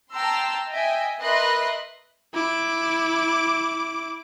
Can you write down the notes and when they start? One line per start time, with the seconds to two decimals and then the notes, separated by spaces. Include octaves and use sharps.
0.12 G5 A5 A#5 C6 E6
0.70 D#5 E5 G5 G#5
1.19 A#4 B4 D#5 E5 C6 F#6
2.34 E4 D6